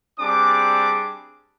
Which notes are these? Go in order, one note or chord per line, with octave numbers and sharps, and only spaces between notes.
G3 C4 D4 G#4 D6